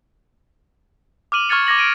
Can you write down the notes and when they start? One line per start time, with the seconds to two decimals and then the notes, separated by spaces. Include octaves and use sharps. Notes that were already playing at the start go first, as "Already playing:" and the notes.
1.32 D6 F6 D#7 F#7
1.49 C#6 F6 G#6 A6 C#7
1.67 D6 G#6 A#6 F#7
1.78 D7 D#7